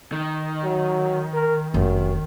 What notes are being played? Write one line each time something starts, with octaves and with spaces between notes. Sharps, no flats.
D#3
F#3
A#4
F1 F#2